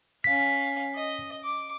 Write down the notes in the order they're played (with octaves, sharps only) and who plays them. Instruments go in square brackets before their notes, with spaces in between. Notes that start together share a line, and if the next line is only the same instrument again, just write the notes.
[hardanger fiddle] C#4 F5 [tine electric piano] B6
[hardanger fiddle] D#5
D6